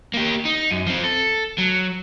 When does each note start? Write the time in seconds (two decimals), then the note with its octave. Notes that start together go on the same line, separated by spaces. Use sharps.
0.14 A#3 G4
0.45 D#4
0.71 F#2
0.87 F3 C4
1.04 A4
1.58 F#3